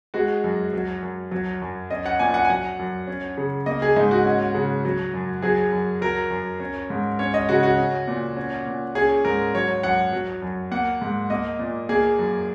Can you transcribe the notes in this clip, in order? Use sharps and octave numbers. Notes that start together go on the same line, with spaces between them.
G#3 F#4
F#2
F#3
F#2
F#3
F#2
C#4 D#5
F#5
A#2 G#5
F#5
G#5
F#3 F#5
F#2
C#4
C#3
A#3 D#5
G#4
G#2 D#4
F#4
C#4
C#3
F#3
F#2
F#3 G#4
F#2
F#3 A#4
F#2
C#4
G#2
C#4 C#5
D#5
C#3 F#4
F#4
C#4
A#2
C#4
A#2
C#4 G#4
G#2 A#4
F#3 C#5
F#2 F#5
F#3
F#2
A#3 F#5
G#2
A#3 D#5
A#2
A#3 G#4
F#2